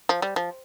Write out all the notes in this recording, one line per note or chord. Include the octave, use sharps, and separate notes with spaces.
F3
G3
F3